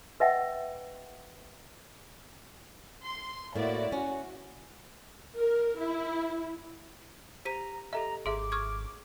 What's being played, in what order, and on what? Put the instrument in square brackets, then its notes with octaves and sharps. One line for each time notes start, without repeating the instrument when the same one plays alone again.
[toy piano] B4 D#5 E5 F#5 G5
[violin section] C6
[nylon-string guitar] A2 A#3 [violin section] E4 F#4 D5
[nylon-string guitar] C#4 [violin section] F#4
[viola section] A#4
E4
[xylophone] G4 B6 D#7 [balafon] C5 [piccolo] A#5
[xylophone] G4 A4 D#5 [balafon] E5 [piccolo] A#5
[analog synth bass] G#1 [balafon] G#4 E5 [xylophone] C6 [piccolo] D6
[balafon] C#6 [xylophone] D#6 F6 G#6